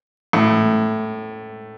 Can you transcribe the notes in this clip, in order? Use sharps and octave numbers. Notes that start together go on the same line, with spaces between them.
A2